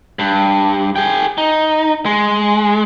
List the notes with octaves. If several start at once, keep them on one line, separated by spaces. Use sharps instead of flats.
G2
G#4 G5
D#4
G#3